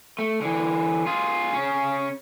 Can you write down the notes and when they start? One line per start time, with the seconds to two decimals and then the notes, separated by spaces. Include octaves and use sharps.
0.19 A3
0.41 D3 E3
1.06 F4 G#4
1.53 C#3 C#4